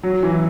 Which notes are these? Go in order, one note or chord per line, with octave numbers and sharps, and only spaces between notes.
F#3
E3